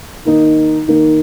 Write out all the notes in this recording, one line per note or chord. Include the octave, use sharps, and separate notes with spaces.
D#3 A#3 D#4
D#3 A#3 D#4